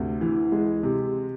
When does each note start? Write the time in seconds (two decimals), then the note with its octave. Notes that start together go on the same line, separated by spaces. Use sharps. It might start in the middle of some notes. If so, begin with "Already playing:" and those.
Already playing: D2 C3
0.21 E3
0.52 G#3
0.83 C3